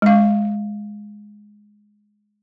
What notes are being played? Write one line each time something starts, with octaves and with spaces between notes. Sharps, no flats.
G#3 F5